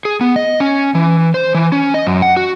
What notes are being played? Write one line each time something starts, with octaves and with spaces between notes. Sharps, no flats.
G#4
B3
D#5
C#4
E3
C5
E3
C#4
D#5
F#2
F#5
F#4